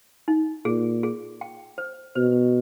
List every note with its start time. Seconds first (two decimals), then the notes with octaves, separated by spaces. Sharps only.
0.28 D#4
0.65 A#2 G#4
1.03 G#4
1.41 G5
1.78 C5
2.15 B2 C5